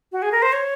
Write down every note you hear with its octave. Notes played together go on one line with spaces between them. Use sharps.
F#4
G#4
A#4
C5
C#5